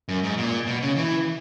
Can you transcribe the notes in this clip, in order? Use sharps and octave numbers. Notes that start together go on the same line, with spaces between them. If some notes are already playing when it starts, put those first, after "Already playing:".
F#2
G#2
A#2
B2
C#3
E3